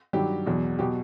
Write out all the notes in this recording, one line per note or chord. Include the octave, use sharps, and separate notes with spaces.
G2 D#3 F#3 G4
E2 B2 F#3
B2 F#3 G4